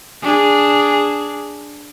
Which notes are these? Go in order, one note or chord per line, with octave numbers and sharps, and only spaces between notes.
D4 G#4